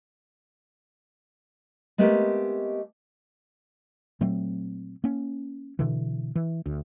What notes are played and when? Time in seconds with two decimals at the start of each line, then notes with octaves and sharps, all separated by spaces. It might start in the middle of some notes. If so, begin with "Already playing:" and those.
1.98 G#3 A3 B3 C4 G4 A#4
4.21 A#2 F#3 A3 C4
5.04 A#3 C#4
5.79 B2 D3 E3
6.36 E3
6.66 D2